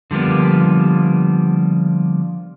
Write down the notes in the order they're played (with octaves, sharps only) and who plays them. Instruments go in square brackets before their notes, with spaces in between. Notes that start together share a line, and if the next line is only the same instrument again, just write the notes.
[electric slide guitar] D3 F3 G3 A#3 B3